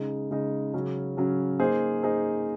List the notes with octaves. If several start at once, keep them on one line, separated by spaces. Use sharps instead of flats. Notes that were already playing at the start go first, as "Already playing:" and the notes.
Already playing: C#3 G#3 D#4
C#3 G#3 D#4
C#3 F#3 C#4
C#3 F#3 C#4
A#3 D#4 G#4 C5
A#3 D#4 G#4 C5